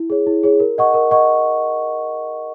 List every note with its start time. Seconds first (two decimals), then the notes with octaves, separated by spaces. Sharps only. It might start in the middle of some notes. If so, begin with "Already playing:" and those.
Already playing: E4
0.10 G#4 C#5
0.27 E4
0.43 G#4 C#5
0.60 A#4
0.78 D#5 F#5 C#6
0.94 A#4
1.11 D#5 F#5 C#6